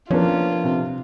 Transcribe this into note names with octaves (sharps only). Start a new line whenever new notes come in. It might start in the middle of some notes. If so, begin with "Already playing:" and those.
F3 A#3 B3 C#4 D4 F4
C3